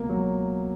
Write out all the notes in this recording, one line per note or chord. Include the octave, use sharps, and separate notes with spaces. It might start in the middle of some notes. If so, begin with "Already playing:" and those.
Already playing: C#2 B2 A#3
F#3